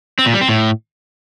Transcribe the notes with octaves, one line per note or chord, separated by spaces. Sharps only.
C4
A#2
G3
C4
A2